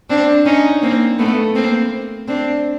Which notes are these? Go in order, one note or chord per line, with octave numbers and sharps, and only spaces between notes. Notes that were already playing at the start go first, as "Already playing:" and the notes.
C4 D4
C#4 D#4
A#3 C4
A3 B3
A#3 C4
C4 D4